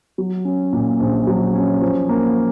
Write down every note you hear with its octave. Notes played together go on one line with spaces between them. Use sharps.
F#3
C#4
A#2
A#1
F#3
C#4
F3
A#3